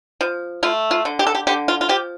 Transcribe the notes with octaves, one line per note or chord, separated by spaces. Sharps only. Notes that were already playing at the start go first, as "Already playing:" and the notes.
F3
A3 F4
F4
D3
G4
A4
G4
D3 G4
F4
F4
F3 G4